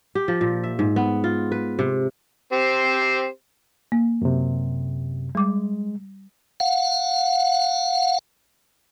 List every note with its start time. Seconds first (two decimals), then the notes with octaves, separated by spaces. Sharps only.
0.15 G4
0.28 F3
0.41 A#2
0.63 E5
0.79 G#2
0.96 B3
1.24 F4
1.52 B4
1.79 C3
2.52 C4 G4 C5
3.92 A#3
4.22 F#2 C3
5.35 G3 G#3 D6
6.60 F5 F#5